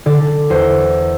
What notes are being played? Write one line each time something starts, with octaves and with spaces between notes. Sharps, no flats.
D3 D5
E2 C5